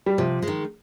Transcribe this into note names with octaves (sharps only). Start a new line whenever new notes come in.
G3
C3 F3
G#3
D#3